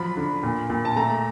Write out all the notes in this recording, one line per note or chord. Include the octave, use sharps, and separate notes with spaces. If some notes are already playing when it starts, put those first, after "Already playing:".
Already playing: F3 F#3 B5
D3
A#2
A#2
A5
A3 A#5